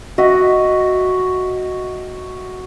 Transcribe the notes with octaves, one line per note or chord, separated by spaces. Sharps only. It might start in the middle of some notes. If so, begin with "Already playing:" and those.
F#4 D#5 E5